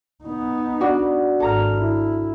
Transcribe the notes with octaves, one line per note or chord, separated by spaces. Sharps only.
B3 D#4
D4 F#4
G#1 A4 A#5 F6
E4